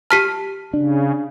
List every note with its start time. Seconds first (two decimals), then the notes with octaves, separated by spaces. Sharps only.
0.10 G4 A5 F6 B6 D#7
0.73 C#3 D4